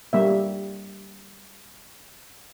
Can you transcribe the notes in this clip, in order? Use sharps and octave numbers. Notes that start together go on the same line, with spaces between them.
G3 A#3 E5